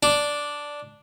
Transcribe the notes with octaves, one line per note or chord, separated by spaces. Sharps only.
D4